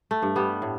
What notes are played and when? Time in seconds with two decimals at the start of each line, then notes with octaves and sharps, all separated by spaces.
0.11 A3
0.22 G2
0.36 G3 B3
0.62 A2